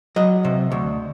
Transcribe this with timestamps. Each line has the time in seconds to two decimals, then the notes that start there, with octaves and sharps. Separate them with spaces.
0.16 F#3 D#5
0.45 C3
0.72 D2